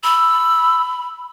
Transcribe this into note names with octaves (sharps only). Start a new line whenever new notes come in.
B5 E6